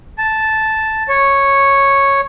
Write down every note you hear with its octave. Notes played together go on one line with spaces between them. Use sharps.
A5
C#5